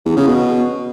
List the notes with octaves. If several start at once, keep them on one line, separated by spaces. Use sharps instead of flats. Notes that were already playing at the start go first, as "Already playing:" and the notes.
E2
C#3
B2